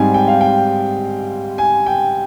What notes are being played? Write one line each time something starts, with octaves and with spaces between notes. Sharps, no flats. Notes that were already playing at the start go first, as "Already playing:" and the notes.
Already playing: G#2 G3 C4 G#5
G5
F5
G5
G#5
G5